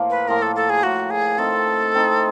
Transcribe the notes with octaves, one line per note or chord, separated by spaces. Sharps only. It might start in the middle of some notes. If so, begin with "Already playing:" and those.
Already playing: A2 F3 A#3
B4
A2 F3 A#3 A#4
A4
A4
G#4
A2 F3 A#3 F#4
G#4
A3 C4 D#4 A4
A3 C4 D#4